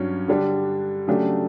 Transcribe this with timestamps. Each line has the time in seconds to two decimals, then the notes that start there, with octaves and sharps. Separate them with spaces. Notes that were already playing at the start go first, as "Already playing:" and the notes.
Already playing: G2 F#3 C#4
0.28 D3 G3 D4
1.07 C#3 F#3 A3 D4 G4